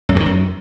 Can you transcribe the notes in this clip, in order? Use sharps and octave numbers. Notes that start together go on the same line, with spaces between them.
F#2
G2
D#3
F#2